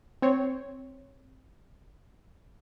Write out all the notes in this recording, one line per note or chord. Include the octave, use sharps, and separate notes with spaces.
C4 C#5